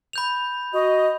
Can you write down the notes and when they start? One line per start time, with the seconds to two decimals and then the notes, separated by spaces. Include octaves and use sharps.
0.13 B5 G6 F7
0.74 F#4 D#5